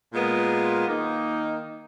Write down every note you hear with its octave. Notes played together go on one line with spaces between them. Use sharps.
A#2 G#3 B3 F4 A#4
D#3 A#3 D#4